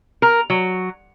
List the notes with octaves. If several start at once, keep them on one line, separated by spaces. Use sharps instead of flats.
A#4
F#3